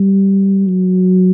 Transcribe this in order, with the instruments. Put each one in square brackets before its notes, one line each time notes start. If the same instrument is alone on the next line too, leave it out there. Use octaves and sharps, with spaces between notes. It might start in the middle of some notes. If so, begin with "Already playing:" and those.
Already playing: [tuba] G3
F#3